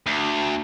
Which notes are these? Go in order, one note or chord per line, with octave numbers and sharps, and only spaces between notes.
D2